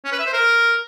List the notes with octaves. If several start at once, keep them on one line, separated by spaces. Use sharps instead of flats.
C#4
B4
E5
C5
A#4